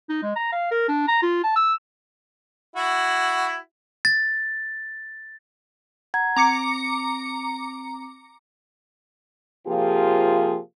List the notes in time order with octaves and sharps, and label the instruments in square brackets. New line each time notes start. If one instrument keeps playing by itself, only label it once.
[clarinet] D#4
G#3
A#5
F5
A#4
D4
A#5
F4
A5
E6
[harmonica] E4 F#4
[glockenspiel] A6
[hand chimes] F#5 A#5 G#6
[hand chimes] C4 [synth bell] A#5 D6 C#7
[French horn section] C3 F3 A#3 F4 G4 G#4